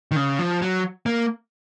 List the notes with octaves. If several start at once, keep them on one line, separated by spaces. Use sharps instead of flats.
D#3
C#3
F3
F#3
A#3